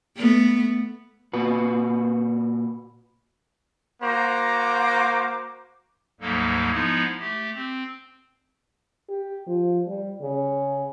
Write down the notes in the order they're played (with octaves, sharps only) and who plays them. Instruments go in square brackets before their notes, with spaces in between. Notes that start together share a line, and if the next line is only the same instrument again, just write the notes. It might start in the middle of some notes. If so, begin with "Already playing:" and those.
[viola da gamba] A3 B3
[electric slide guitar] A#2 F#4 B4
[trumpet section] A#3 F#4 C5 A#5 D6
[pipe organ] D2 G#2 F#3 G3 A#3 A4
F3 G#3 B3 D#4 E4
A3 G4
C4
[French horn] G4
F3
G3
C#3